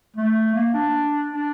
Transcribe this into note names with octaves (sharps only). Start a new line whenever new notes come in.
A3
A#3
D4
D4